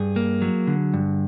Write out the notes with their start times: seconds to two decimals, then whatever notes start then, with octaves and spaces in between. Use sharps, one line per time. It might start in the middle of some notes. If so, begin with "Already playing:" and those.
Already playing: G2 G#4
0.16 A#3
0.42 F#3
0.67 D3
0.94 G2